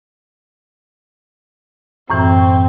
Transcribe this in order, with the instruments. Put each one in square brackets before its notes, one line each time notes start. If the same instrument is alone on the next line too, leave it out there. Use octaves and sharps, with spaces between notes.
[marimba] F#2 A2 E3 [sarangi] C4